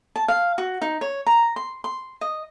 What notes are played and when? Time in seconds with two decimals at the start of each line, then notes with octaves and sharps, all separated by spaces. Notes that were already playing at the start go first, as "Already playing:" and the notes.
0.16 A5
0.28 F5
0.58 F#4
0.82 D#4
1.01 C#5
1.27 A#5
1.56 C6
1.84 C6
2.21 D#5